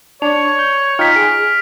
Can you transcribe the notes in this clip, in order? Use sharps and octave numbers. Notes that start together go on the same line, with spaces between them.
D4 C#5 F7
G6
D#4 F4 G5 F6 B6
G#4 D7